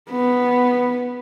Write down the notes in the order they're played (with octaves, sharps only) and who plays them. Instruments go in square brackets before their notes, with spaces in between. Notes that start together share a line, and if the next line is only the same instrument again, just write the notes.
[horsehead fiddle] B3